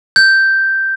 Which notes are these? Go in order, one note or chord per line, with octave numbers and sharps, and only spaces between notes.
G6